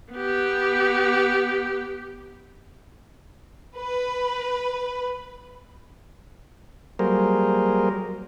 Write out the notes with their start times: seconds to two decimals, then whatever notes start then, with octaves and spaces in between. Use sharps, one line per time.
0.13 B3 G4
3.78 B4
6.99 F#3 G3 A#3 G#4 A#4 C5